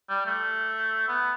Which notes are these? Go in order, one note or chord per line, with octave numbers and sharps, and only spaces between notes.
G3
A3
B3